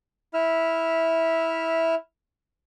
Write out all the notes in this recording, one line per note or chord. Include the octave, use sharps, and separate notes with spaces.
E4 E5 F6